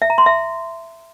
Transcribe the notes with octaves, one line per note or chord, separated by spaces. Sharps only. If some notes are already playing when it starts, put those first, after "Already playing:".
E5
A#5
C6
E5